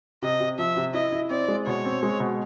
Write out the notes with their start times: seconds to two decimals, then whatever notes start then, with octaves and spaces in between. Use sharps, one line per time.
0.22 C3 D#5
0.40 C3
0.58 F3 E5
0.77 C3
0.94 E4 D#5
1.12 E4
1.30 C4 D5
1.48 G#3
1.66 B2 C#5
1.85 C4
2.03 G#3
2.20 B2